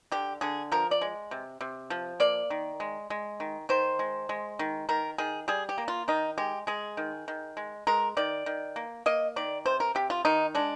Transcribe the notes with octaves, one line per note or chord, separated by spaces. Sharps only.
D3 G4
D3 G#4
F3 A#4
D5
G#3
C3
C3
F3
A#3 D5
D#3
G#3
G#3
D#3
D#3 C5
G#3
G#3
D#3
D#3 A#4
D#3 G#4
G3 G#4
G4
A#3
F4
D#3 D#4
G#3 G4
G#3 G#4
D#3
D#3
G#3
G#3 A#4
D#3 D5
D#3
A#3
A#3 D#5
D#3 D5
C3 C5
A#4
C3 G4
F4
D#3 D#4
G#3 D4